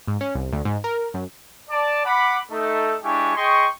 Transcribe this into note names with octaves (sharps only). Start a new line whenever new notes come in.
G#2
C#4
C2
D2
G#2
A#4
F#2
D5 A5
F#5 B5 D6
A3 D#4 A4
G#3 D4 E4 G4 G#5 C#6
G#4 D#5 G5 C6 C#6